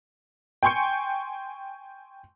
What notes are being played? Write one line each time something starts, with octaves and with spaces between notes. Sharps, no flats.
G5 G#5 C6 C#6 G6 C#7